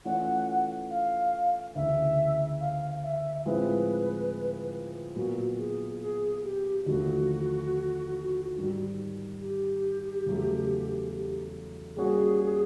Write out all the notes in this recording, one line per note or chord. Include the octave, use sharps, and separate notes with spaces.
E3 A3 C#4 F4 F#5
F5
D2 C#3 E3 E5
F5
E5
A2 F3 G#3 C4 E4 B4
A#2 F#3 B3 F#4
G#4
G#4
G4
D#2 D3 F3 A3 F#4
G#2 D#3 G3
G4
E2 C#3 F#3 A3
G3 A#3 C#4 F#4 G#4